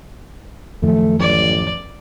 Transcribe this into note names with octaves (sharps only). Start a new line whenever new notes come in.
F#2 D#3 F3 A3
A1 D5